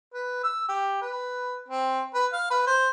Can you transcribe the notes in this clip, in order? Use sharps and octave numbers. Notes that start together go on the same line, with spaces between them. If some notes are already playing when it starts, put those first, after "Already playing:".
B4
E6
G4
B4
C4
B4
F5
B4
C5